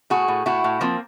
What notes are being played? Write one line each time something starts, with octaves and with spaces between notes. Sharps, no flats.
A2 F#4 G#4
A2
A2 E4 F#4
A2
F3 A#3 C4